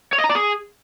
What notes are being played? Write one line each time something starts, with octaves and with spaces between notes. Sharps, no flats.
C#5
D#5
A#5
D5
G#4